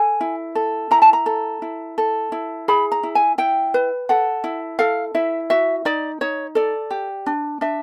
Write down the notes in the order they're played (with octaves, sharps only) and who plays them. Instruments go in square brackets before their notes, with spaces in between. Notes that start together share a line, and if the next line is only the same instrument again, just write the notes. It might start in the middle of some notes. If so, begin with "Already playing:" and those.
Already playing: [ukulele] A4 G#5
E4
A4
E4 A#5
A5
A#5
A4
E4
A4
E4
G#4 B5
A#5
E4
G#5
E4 G5
B4
A4 F#5
E4
A4 F5
E4 E5
F#4 E5
D#4 D5
D#4 C#5
A4 D5
G4
D4
D4 E5